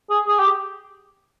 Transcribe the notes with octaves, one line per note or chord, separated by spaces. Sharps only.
G#4
G#4
G4